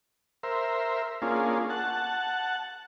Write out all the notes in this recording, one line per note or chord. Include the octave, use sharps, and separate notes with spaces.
A#4 C5 E5
A#3 C#4 D4 F4 G#4
F#5 A5